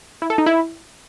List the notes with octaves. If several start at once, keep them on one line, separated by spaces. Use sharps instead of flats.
E4
A4
D#4
E4